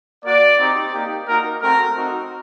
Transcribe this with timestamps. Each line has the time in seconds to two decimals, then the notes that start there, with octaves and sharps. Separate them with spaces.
0.23 A#3 F#4 D5
0.57 C4 D#4 G4
0.92 A#3 D#4 G4
1.26 A#3 D#4 F#4 A#4
1.60 A3 C4 F#4 A#4
1.95 C4 D#4 F#4